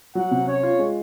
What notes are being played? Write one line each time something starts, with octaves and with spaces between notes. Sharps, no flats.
F#3 F#5
C3
C#4 C#5
F4
G#3